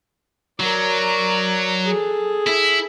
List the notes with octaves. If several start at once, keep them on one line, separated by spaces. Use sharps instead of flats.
F#3 A#4 D5
G#4 A4
E4